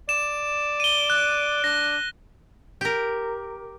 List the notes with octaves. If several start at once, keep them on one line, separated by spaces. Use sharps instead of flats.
D5 E7
D#7 G7
F#6
D4 A#6
G4 A#4